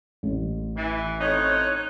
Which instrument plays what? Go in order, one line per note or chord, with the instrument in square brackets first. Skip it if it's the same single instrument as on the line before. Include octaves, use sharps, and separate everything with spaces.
[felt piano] A1
[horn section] E3
[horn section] A2 C4 D#4 [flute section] C#5 F#6